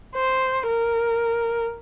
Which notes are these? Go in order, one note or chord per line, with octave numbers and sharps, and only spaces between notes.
C5
A#4